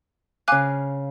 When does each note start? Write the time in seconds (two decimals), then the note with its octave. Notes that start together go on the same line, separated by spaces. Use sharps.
0.48 C#3 F5 G#5 D6 F#6